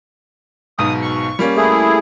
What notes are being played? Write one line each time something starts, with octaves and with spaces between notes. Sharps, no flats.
B1 G#2 B2 D#6
C#6
G3 A#3 C#4
A3 E4 G#4